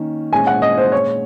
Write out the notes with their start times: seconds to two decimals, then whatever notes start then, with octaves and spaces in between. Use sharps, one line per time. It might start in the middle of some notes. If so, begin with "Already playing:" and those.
Already playing: D#3 A#3 C#4
0.32 A#2 G#3 C#4 G#5
0.47 F#5
0.62 D#5
0.78 C5
0.92 C#5